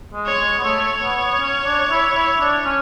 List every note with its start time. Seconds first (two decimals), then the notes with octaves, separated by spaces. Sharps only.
0.13 G#3
0.26 C#5
0.39 G#3
0.58 B3
0.64 A3 C#5
1.02 B3
1.40 C#4
1.65 D4
1.90 E4
2.15 E4
2.40 D4
2.65 C#4